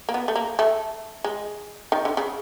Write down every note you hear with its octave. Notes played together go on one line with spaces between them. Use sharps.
A#3
B3
A3
A#3
A3
G#3
D#3
D3
C#3